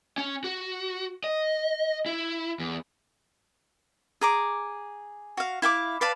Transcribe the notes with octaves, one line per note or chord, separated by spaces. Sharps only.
C#4
F#4
D#5
E4
E2
G#4 A#5 D6
F#4 F5
E4 F5 G5 D6
B4 D5 F5 A5